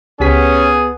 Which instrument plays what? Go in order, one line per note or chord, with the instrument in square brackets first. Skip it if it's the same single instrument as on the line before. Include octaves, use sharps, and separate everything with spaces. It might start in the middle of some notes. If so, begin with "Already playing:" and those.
[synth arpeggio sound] C#2 G4 B6 [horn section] B3 G#4 [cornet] C#4